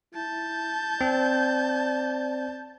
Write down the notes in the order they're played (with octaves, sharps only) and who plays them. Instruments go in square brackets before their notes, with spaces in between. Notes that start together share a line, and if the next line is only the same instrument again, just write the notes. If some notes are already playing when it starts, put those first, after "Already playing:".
[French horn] E4 [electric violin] A5 G6
[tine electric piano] C4 [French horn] D5